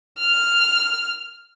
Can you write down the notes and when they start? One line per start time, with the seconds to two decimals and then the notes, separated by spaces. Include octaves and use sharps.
0.19 F6